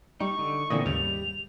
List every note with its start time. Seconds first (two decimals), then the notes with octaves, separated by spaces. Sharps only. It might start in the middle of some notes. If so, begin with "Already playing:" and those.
0.20 G3 D#4 C#6
0.39 D3 D#4
0.70 A#2 D3 E3 B3 C4 D#5
0.86 D#2 G#2 C#3 G3 G6 F7